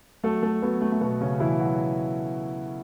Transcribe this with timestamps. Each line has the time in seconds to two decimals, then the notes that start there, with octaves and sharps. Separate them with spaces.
0.24 F#3 A3 A4
0.43 A3 A4
0.62 F#3 B3
0.81 A3
0.92 A3
1.01 B2 B3
1.21 C#3 C#4
1.40 B2 E3 E4
1.60 F#3 F#4